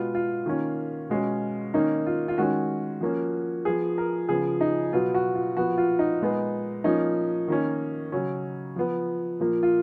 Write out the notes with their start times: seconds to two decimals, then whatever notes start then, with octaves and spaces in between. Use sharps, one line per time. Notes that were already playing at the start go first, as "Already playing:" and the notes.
Already playing: B2 G#3 B3 F4
0.15 F4
0.46 D#3 A#3 C#4
1.10 B2 G#3 C#4
1.74 D#3 A#3 C#4 D#4
2.06 F4
2.28 F4
2.38 D#3 G#3 C#4 F#4
3.01 F3 A#3 C#4
3.65 F3 B3 G#4
3.98 A#4
4.29 C#3 F3 B3 G#4
4.61 D#4
4.93 B2 F#3 B3 F4
5.14 F#4
5.35 F4
5.57 A#2 F3 B3 F#4
5.78 F4
5.99 D#4
6.21 A#2 G#3 B3
6.84 F3 A#3 C#4 D#4
7.48 D#3 A#3 C#4
8.12 C#3 F#3 C#4
8.76 F3 B3
9.40 A#2 F3 A#3
9.63 F4